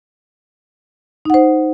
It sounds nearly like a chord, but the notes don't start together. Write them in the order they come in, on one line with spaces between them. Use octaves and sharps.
D#4 F#5 C5